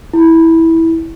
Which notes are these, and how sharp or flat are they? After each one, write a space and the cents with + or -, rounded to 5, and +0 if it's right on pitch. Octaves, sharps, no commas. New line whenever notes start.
E4 -15